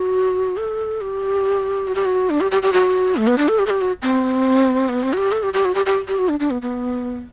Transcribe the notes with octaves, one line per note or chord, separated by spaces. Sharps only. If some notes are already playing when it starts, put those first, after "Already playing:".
Already playing: F#4
A4
G4
F#4
G4
F#4
D4
G4
G4
G4
F#4
A3
B3
D4
A4
G4
A4
G4
F#4
C4
B3
C4
F#4
G4
A4
G4
G4
F#4
G4
G4
G4
F#4
D4
D4
B3
B3